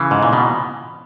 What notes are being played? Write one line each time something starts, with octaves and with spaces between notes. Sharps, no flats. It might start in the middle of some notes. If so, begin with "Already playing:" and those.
Already playing: C#3 E3
G#2
A#2
B2